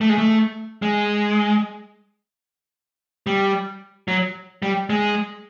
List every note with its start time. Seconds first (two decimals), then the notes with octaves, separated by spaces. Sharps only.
0.01 A3
0.09 G#3
0.18 A3
0.82 G#3
3.27 G3
4.08 F#3
4.62 G3
4.90 G#3